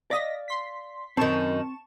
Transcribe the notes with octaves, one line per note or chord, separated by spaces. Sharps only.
D5 D#5 F5 A#6 B6
C6 B6
F#2 D#3 C4 A5 C#6 E7